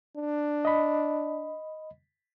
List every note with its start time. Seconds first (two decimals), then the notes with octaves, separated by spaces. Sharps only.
0.17 D4
0.65 D#5 B5